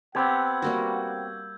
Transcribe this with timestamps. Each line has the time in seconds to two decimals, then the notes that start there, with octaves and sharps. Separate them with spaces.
0.15 B3 C4 G4 F#5 E6 G6 G#6
0.62 G3 A#3 F#4